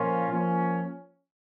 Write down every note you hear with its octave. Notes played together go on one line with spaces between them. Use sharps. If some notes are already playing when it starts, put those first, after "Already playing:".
Already playing: A#2 F3 A#3 C#4 F4
F3 A#3 C#4